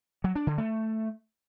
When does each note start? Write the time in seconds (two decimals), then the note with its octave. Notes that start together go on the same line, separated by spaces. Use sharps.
0.24 F#3
0.35 D4
0.47 D3
0.58 A3